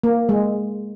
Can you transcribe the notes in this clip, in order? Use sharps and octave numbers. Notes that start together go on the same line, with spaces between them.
A#3
G#3